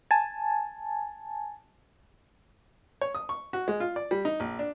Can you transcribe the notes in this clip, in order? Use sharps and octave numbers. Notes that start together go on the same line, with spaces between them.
G#5 A5
C#5
D#6
C#6
F#4
G#3
F4
D5
G3
D#4
A#1
D4